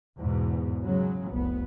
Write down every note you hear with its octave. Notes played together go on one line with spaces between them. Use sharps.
E2 G#2 B2
C#3 F#3 G#3
F1 C2 B3